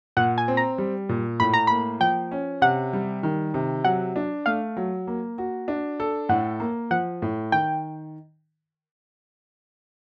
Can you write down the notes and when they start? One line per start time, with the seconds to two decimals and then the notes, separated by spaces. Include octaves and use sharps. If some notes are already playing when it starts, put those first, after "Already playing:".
0.17 A#2 F#5
0.38 G#5
0.48 C4
0.57 A#5
0.78 G3
1.09 A#2
1.40 A2 B5
1.54 A#5
1.67 A#3 B5
2.00 F3 G5
2.32 C#4
2.62 C3 F#5
2.93 G3
3.23 D#3
3.54 C3
3.84 F#3 F#5
4.16 D4
4.46 A3 F5
4.77 F#3
5.07 A#3
5.38 F#4
5.68 D4
6.00 A4
6.29 A2 F#5
6.60 A#3
6.91 F3 F#5
7.22 A2
7.52 D#3 G5